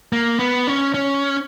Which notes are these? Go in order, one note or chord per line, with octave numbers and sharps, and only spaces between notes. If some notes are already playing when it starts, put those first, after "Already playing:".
A#3
B3
C#4
C#4